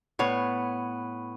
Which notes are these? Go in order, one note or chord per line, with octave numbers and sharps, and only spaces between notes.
A2 B3 C#5